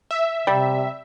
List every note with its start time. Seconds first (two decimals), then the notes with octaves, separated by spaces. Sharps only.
0.11 E5
0.47 C3 G3